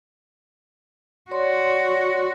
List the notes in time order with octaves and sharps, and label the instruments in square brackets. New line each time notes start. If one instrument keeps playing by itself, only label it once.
[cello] F#4 [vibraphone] C#5 D5 C6